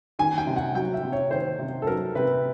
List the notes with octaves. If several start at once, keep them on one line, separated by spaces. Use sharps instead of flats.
D#3 G#5
G5
C3
F#5
F#3 G5
E5
C3
C#5
D#3 C5
C3
A4
F#3 A#4
C3 B4